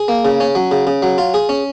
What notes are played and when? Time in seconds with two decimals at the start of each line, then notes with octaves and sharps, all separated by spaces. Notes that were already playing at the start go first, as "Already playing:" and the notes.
Already playing: G#4
0.08 A#3
0.25 C#3
0.40 C#4
0.55 F#3
0.71 C#3
0.87 C#3
1.02 F#3
1.18 F4
1.34 G#4
1.49 C#4